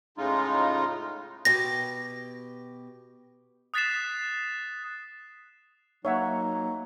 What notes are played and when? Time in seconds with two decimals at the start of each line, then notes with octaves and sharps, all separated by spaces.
0.18 A2 C#3 G#3 D#4 F4
1.45 B2 G4 A#6
3.74 D#6 F#6 A6 B6 C7 E7
6.05 F#3 A#3 D#4 C#5 E5 F#5